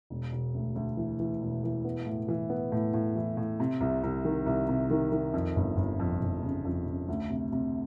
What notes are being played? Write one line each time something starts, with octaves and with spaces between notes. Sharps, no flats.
E1
E1
D2
D2
E3
E3
E1
E3
B3
A2
E3
B3
A2
A2
E3
A2
C3
C2
C2
D#3
C2
C3
D#3
D#3
F2
G1
G1
F2
G1
C#3
F2
C#3
D2
C3
C3